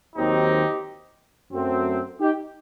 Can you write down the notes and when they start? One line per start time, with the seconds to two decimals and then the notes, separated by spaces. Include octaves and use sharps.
0.16 D#2 D#3 F#3 C4 D#4 G4
1.52 F#2 F#3 A3 C4
2.20 D#4 G4